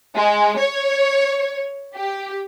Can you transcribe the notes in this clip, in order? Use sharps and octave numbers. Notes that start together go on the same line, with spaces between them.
G#3
C#5
G4